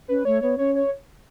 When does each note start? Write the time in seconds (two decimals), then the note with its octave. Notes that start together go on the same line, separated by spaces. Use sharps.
0.08 C#4 B4
0.25 A3 C#5
0.42 B3 C#5
0.58 C#4 C#5
0.75 C#5